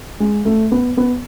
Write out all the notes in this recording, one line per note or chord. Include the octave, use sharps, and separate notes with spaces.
G#3
A3
B3
B3